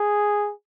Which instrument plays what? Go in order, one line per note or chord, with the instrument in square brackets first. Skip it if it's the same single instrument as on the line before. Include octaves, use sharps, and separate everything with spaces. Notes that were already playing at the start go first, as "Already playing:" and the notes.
Already playing: [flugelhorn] G#4